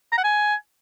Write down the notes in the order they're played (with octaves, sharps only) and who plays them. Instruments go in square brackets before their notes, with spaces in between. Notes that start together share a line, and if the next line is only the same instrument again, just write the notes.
[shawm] A#5
F#5
G#5